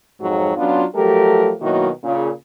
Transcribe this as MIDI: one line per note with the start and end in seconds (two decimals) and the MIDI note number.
0.21 0.50 41
0.21 0.50 44
0.21 0.50 54
0.56 0.83 54
0.56 0.83 59
0.56 0.83 61
0.56 0.83 62
0.56 0.83 65
0.95 1.51 53
0.95 1.51 54
0.95 1.51 57
0.95 1.51 67
0.95 1.51 69
0.95 1.51 70
1.61 1.89 47
1.61 1.89 51
1.61 1.89 54
1.61 1.89 58
1.61 1.89 64
1.61 1.89 66
2.04 2.30 46
2.04 2.30 49